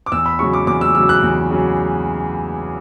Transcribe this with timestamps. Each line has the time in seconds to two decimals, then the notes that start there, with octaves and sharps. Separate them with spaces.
0.06 D6
0.12 E2 E6
0.26 B5
0.39 C#3 F#3 C#6
0.53 D6
0.67 E2 D6
0.81 E6
0.95 C#3 F#3 E6
1.09 F#6
1.23 E2
1.51 C#3 F#3